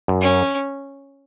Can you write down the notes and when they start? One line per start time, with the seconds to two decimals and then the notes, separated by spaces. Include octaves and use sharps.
0.08 F#2
0.22 C#4